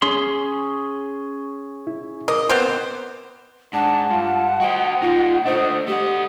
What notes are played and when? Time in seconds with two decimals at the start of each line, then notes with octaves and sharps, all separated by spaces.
0.02 C#4 G#4 C6
1.87 E4
2.28 A#4 D#5 D6
2.49 B3 C4 C5
3.73 G#2 D4 F#5 A5
4.11 G2 F4
4.60 F#4 C5 D#5 G5
5.02 A#2 D#4 F4
5.46 A3 D4 C5 D#5
5.88 A3 G4 F#5